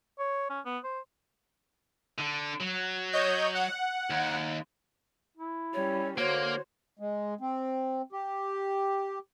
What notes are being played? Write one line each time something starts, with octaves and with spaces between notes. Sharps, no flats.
C#5
C#4
B3
C5
D3
F#3
C#5 D#5 G6
F#5
D#2
E4
G3 C#4 C#5
D3 A#3 F#4 C5 C#5
G#3
C4
G4